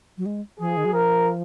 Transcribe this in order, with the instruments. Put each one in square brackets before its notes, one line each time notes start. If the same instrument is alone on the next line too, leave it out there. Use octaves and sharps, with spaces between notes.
[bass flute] F#3
G#3
[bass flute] F3 [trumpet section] G#4
[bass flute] D#3
F#3
[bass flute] F3 [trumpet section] A#4